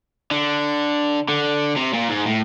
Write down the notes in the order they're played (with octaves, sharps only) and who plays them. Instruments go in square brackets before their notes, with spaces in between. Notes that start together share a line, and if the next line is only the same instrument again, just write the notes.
[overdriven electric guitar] D3
D3
C3
A#2
G#2
A2